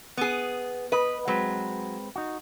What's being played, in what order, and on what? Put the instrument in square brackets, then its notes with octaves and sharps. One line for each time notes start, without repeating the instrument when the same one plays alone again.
[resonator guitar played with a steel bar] B3 G#4
[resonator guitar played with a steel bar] B4 [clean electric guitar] D#5
[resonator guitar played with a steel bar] F#3 [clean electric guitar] G#3 C4 B4
[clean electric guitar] D#4 F#4